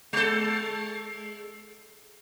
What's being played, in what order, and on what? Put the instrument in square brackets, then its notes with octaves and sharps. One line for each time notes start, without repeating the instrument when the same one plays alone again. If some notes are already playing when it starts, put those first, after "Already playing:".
[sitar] G#3 A4